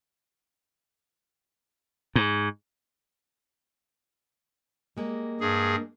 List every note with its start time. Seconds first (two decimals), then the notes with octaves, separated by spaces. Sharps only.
2.15 G#2
4.97 G3 G#3 A#3
5.41 G2 G#4